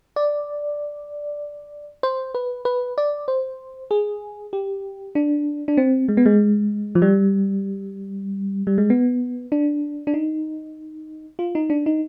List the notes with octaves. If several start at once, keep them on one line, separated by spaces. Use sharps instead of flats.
D5
C5
B4
B4
D5
C5
G#4
G4
D4
D4
C4
G#3
B3
G#3
F3
G3
G3
G#3
B3
D4
D4
D#4
F4
D#4
D4
D#4